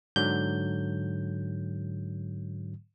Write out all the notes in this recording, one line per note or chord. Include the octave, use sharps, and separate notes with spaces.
G#2 D3 F#3 G6